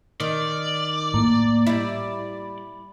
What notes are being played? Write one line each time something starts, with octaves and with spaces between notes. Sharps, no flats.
D#3 D5
A2 A#3
G3 E4 B5